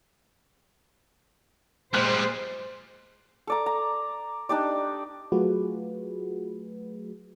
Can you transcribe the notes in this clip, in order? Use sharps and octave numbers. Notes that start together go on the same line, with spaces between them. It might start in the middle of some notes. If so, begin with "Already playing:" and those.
A#2 G3 G#3 C5 F6 F#6
A4 D5 A#5
A#5
D4 D#4 G4 D5
F#3 A3 F4 F#4 G#4 B4